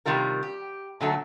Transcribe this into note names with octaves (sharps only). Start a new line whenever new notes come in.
C3 D#3 G3 F4 A#4
G4
A#2 D3 F#3 A3